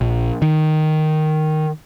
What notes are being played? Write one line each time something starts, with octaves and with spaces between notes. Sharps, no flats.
A#1
D#3